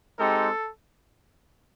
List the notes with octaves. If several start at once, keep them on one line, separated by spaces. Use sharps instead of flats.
G#3 C4 D#4 G4 A4